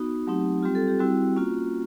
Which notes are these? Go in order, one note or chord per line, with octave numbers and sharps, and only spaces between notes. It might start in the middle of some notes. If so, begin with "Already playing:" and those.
Already playing: B3 D#4 F#4
F#3 A3 C4 D#4 G4
G3 C4 F4 G4
A4
G4
G3 C4 E4 F#4
A#3 C#4 F4